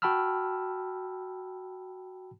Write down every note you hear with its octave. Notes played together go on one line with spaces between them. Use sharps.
F#4 G5 A5 B5 E6 F6